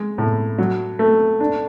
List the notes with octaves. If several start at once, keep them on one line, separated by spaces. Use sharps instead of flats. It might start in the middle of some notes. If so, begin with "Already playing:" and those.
Already playing: G#3
A2
F#3
A3
D4